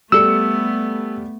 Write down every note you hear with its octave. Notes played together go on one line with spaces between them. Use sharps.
G3 A3 B3 A4 E6 C#7